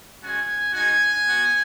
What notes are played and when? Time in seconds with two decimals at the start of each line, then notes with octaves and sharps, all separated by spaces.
0.22 G#3 C#4 F#4 G#5
0.73 G#3 D#4 F#4 G#5
1.25 B3 F#4